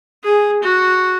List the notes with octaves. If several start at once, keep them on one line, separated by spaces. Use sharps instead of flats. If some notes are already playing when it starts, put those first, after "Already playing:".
G#4
F#4